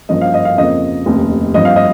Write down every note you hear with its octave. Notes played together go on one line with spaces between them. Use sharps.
G2 F3 A#3 C#4 D#5
F5
D#5
F5
F2 C#3 F3 A#3 D#5
F1 D#2 C#3
G2 F3 C4 D#5
F5
D#5